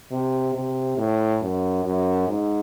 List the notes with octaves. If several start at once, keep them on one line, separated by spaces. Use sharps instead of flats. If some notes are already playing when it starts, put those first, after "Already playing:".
C3
C3
A2
F#2
F#2
G#2